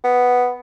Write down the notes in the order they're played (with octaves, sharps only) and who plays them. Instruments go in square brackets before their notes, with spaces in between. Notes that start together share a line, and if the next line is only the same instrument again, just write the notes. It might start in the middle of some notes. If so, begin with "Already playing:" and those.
[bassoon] B3